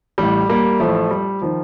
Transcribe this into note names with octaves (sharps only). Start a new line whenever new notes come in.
A1 A2 G3
G3 A#3
A1 A2 F3 A3
G3
D#3 F3